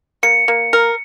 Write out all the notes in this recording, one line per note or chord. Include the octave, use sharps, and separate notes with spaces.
A#3 C#7
A#3
A#4